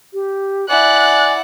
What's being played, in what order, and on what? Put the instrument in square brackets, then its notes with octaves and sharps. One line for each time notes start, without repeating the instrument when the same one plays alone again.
[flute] G4
[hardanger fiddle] E4 F#5 [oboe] D5 [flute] G#5 [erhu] F#6